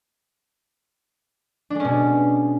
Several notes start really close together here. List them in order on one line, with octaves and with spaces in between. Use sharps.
D4 G#3 C#4 B2